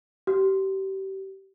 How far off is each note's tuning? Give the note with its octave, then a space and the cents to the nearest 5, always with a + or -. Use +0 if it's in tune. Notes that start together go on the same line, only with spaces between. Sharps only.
G4 -30